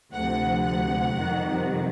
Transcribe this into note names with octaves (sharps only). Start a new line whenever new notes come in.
D2 C3 F3 F#5
F#5
F2 C3 D#3 G3